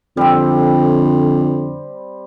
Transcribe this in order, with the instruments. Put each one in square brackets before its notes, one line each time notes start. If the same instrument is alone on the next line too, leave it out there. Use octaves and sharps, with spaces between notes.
[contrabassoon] F2 [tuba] D3 [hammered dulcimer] G3 C4